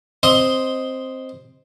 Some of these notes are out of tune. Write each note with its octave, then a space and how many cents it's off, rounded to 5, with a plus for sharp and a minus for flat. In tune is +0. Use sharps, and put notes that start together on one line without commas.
C4 +0 D#5 +0 C6 +0